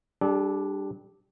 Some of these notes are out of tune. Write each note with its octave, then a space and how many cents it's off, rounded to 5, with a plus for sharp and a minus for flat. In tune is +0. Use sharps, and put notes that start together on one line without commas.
G3 +0 D4 +0 A4 -45